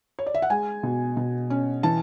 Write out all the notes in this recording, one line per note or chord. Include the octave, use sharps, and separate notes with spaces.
C#5
D5
E5
F#5
G#3 G#5
B2
B2
C#4
E3 A5